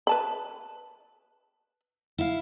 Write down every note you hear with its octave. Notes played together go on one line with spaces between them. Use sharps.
B4 A5 B5
E4 F5